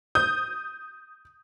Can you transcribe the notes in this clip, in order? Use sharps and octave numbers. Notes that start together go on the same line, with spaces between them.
D#6 G6